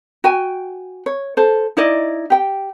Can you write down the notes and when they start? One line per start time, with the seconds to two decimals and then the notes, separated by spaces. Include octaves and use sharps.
0.24 F#4 G5 G#5
1.06 C#5
1.37 A4 C5
1.77 D#4 E4 D5 D#5
2.30 G4 G5